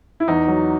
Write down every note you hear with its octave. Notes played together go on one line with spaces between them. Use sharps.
E4
E2 D#4
F#3